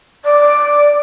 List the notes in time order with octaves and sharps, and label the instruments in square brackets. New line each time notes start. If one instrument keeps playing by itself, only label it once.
[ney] D5